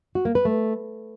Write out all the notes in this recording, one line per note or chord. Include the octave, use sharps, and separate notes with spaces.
F#4
A#3
B4
A3